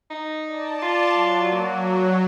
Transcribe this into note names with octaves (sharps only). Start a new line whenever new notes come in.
D#4
D5 A5
F4
F#3
A#3